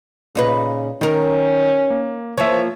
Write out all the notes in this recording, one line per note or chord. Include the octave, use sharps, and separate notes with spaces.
A#2 C#3 D#4 B4
D#3 C#4 D#4 A#4
A#3
E3 F3 A#3 C#5 E5